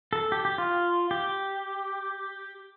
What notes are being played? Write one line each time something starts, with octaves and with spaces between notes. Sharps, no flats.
A4
G4
G4
F4
G4